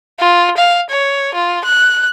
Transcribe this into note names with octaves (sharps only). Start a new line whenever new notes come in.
F4
F5
C#5
F4
F#6